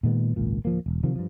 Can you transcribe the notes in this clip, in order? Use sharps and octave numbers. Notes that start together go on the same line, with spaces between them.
A#2 D#3 G#3 B3
G#1 C#2 A#2
D1 F3 A#3
E1
C3 D#3 F3
G2 F3